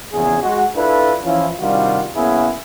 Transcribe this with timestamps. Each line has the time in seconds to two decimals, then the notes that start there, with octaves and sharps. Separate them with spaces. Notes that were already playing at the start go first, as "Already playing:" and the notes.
0.12 A#1 E2 C#3 G#4
0.42 G#3 F#4
0.75 D4 E4 F4 A4 B4
1.24 E3 F3 C#4 E4 F4
1.60 C3 D#3 G3 D4 F4 F#4
2.15 C2 A#3 B3 C#4 E4 G#4